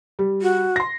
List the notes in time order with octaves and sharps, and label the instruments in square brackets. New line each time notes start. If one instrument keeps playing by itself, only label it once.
[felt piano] G3
[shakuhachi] F#4
[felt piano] C6 A#6